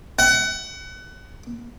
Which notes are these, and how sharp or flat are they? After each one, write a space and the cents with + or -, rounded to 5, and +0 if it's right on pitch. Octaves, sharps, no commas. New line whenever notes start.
F#5 +30